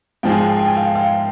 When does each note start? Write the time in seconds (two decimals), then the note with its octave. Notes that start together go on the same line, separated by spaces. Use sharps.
0.23 G#2 F3 G#3 G5
0.32 G#5
0.41 G5
0.50 G#5
0.59 G5
0.68 G#5
0.76 F5 G5
0.95 F5 G5